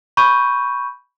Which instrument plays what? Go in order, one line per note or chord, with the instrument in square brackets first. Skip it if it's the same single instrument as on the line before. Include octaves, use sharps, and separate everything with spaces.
[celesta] B5 C#6 G6 D#7